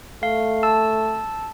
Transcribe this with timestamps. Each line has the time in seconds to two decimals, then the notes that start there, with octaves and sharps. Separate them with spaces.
0.23 A3 F5
0.63 A5 E6